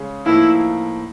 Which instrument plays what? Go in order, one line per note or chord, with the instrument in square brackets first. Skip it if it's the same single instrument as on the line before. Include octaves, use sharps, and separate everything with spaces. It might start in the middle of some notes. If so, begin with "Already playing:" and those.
Already playing: [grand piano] C#3 G#3 C#4
[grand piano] A2 F3 A#3 D#4 [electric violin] E4